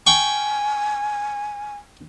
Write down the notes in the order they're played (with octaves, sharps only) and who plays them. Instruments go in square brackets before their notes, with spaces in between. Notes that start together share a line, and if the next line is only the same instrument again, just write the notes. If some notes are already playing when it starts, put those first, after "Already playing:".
[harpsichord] G5 C#6 [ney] G#5